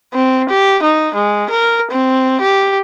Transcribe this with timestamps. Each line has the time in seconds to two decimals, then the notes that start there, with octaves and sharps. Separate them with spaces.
0.14 C4
0.49 G4
0.83 D#4
1.15 G#3
1.50 A#4
1.91 C4
2.41 G4